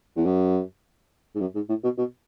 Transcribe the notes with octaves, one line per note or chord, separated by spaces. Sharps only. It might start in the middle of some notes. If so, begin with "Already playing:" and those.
E2
F#2
G#2
F#2
G#2
A2
B2
B2